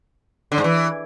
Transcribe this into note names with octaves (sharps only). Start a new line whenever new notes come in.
D3
G#2
E3